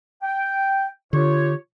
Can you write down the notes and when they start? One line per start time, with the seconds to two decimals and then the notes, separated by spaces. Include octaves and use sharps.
0.22 G5
1.13 D3 F4 G4 C#5